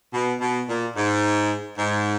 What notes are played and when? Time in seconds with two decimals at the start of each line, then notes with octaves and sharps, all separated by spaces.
0.13 B2
0.40 B2
0.67 A#2
0.96 G#2
1.78 G#2